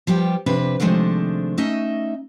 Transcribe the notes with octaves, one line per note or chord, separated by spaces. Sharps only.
F3 G3 B3 G4
F2 C3 D4 B4
C3 D#3 F3 G#3 A3 D4
A3 C#4 D#4 D#5 E5